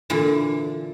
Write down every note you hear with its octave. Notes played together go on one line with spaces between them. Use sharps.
A#2 D3 E3